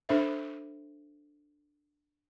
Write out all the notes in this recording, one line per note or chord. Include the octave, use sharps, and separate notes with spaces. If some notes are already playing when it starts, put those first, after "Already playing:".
D4 A4 C5 E5